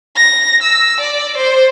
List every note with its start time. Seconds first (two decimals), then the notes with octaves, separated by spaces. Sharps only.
0.17 A#6
0.62 E6
1.01 D5
1.37 C5